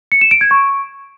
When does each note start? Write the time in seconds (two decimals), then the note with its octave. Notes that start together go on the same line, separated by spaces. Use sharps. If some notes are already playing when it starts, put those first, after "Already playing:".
0.12 C#7
0.21 E7
0.31 D7
0.41 G#6
0.51 C#6